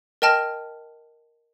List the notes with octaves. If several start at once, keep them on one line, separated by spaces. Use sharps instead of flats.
A#4 D#5 G5 A5 F6 A#6